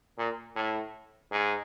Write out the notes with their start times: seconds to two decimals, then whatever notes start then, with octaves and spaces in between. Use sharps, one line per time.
0.18 A#2
0.56 A2
1.31 G#2